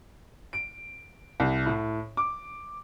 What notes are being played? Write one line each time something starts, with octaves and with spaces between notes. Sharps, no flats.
D7
C2
A2
D6